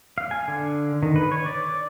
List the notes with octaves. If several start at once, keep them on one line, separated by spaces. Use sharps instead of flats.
F5
G#5
D3
D#3
B4
C#5
D5